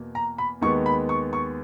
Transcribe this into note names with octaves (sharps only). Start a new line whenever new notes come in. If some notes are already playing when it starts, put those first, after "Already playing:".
Already playing: E2 B2 A#3
A#5
B5
D#2 D#3 G#3 B3 C#6
B5
C#6
C#6